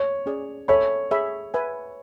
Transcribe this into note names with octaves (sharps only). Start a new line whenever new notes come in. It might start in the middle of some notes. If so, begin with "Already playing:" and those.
Already playing: C#5
C#4 G#4 D5
A4 C#5 E5 G#5 B5
G#4 C#5 E5 B5
B4 E5 G#5